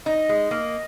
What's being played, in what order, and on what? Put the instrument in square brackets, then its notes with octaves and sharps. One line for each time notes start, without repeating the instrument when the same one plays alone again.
[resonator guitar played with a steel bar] D#4 [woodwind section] D#5
[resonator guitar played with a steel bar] G#3
A#3